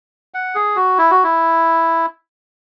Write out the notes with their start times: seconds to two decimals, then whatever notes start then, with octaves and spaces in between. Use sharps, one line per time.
0.34 F#5
0.55 G#4
0.76 F#4
0.98 E4
1.11 F#4
1.24 E4